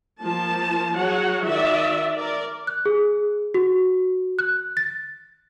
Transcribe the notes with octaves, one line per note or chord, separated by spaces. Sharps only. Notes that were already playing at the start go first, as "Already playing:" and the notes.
F3 A#3 A5
F#3 F#4 G#4 C#5 F#5
D#3 F#4 D5 E5
A#4 D5
F#6
G#4
F#4
F#6
A6